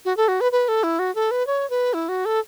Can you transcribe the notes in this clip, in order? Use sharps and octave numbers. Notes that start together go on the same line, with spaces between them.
F#4
A4
F#4
B4
B4
A4
E4
F#4
A4
B4
C#5
B4
E4
F#4
A4